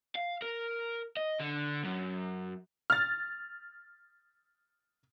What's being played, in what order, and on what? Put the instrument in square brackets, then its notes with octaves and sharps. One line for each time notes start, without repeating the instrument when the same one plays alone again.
[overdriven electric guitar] F5
A#4
D#5
D3
F#2
[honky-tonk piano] F6 A6